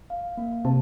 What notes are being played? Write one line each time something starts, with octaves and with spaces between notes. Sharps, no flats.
F5
A#3
C3 A5